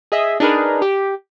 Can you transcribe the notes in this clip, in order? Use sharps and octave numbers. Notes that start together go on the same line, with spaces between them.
G#4 D#5 E5
D4 D#4 G#4 A#4 B4
G4